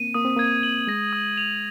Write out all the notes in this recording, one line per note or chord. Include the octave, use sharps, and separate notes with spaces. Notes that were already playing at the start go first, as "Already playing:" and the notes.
Already playing: A#3 C4 D#7
A#3 D#6
C4
A#3 G#6
F#7
G#3 A#6
D#6
F7